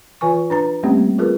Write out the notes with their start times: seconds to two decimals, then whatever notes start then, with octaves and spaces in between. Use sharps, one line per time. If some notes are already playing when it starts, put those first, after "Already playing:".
0.21 E3 F4 B4 G#5 C#6
0.50 D4 B4 A#5
0.83 G3 A3 A#3 C4 C#4 G4
1.18 F4 G#4 A#4 B4